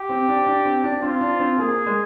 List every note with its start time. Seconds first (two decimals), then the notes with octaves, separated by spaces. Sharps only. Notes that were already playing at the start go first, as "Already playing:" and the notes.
Already playing: G4
0.09 C4
0.28 D4
0.46 D4
0.65 C4
0.84 D4
1.02 C4 F4
1.21 D4
1.40 C4
1.58 A#3 G#4
1.86 G#3